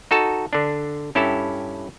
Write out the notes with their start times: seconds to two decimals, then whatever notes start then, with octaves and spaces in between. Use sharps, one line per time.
0.11 D#4 F#4 A4 A5
0.53 D3 D4
1.15 G2 C#4 E4 G4 A4 A5